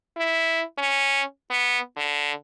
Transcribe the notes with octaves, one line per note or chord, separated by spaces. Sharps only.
E4
C#4
B3
D3